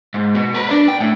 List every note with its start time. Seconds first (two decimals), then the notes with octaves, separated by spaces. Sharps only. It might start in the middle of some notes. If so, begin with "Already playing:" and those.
0.14 G#2
0.35 B2
0.54 A#4 B4
0.69 D4 D5
0.88 G5
1.00 A2